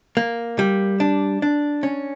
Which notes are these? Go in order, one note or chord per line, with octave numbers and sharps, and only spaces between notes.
A#3
G3
D4
D4
C#4